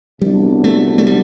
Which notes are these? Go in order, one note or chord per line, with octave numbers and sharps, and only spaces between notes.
C2 C3 F#3 G3 B3 D4
A3
A3
G3